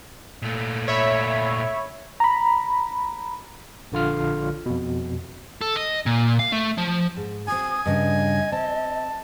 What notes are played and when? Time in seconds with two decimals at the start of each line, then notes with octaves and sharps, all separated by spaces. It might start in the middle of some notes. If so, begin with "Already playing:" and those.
0.42 A#2 A3
0.88 C#5 E5 B5
2.20 A#5 B5
3.92 A#1 D3 F4 F6
4.66 F2 B2
5.61 A4
5.76 D#5
6.06 A#2
6.40 F5
6.52 A3
6.77 F3
7.17 G#2
7.48 C4 F#4 G#5 D#6
7.86 G2 C#3 D4 D#5
8.52 C4 A5